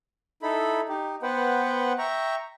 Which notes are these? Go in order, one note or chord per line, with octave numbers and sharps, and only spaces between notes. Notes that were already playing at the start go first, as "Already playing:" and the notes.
D#4 E4 A4 B5
D#4 G4
B3 B4 C5 F#5 G5
E5 G5 A#5 C#6